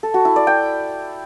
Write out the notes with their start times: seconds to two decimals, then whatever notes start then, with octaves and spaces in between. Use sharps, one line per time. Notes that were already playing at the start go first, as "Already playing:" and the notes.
0.03 A4
0.14 F#4
0.25 E4
0.36 D5
0.47 G5